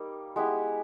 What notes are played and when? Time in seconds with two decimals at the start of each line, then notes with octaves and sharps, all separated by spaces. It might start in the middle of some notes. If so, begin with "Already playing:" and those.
Already playing: G3 A#3 D#4
0.36 G#3 B3 E4 G4